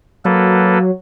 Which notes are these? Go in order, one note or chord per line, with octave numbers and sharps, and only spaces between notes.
F#3 A#3 A4 B4